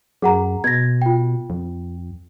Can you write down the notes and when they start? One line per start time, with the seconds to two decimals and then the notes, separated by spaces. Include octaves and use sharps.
0.22 F#2 G#4 F#5 A#5
0.64 B2 G#6 A#6
1.02 F4 G5
1.50 F2